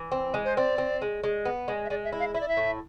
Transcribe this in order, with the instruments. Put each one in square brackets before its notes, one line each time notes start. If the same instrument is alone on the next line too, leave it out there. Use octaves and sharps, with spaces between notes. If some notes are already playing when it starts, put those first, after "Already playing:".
Already playing: [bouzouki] E3
C4
G#3
[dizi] C5
[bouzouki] C4 [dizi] D5
[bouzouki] C4
G#3
G#3
B3
G#3
[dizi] E5
[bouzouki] G#3 [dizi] D5
[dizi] E5
[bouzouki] E4
[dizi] F5
[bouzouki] E4 [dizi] E5
[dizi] D5
E5
[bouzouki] A2